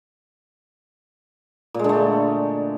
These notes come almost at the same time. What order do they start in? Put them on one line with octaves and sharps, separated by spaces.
A#2 G#3 D3 A3